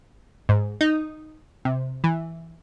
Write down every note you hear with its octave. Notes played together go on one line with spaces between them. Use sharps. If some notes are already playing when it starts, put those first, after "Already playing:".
G#2
D#4
C3
E3